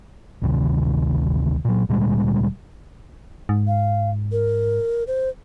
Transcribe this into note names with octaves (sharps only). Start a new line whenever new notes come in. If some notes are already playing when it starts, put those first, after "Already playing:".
A1 D2 C3 D#3
A#2 F#3
D2 A#2 G3 G#3
G#2
F5
A#4
C5